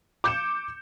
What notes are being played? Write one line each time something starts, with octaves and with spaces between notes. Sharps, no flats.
D6 G6 C#7 E7